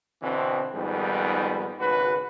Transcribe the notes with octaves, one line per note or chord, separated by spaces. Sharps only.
B2 D3 E3 C4
F2 G#2 D#3 G3 B3
G#1 C#2 F#4 B4